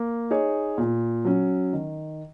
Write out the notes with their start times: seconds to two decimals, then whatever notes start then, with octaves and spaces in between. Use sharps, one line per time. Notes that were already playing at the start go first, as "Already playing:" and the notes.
Already playing: A#3
0.30 D#4 G#4 C#5
0.78 A#2
1.25 F#3 C#4
1.73 D#3